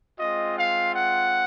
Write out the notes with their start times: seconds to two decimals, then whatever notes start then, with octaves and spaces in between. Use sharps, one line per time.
0.20 G#3 C4 F4 D#5
0.58 F5
0.95 F#5